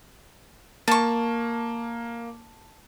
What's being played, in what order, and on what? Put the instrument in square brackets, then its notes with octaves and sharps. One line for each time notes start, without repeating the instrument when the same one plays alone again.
[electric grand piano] A#3 [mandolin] A5 C#6